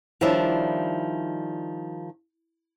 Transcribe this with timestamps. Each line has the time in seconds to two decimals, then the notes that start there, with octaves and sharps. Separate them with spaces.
0.21 D#3 F3 G3 C#4 D4 E4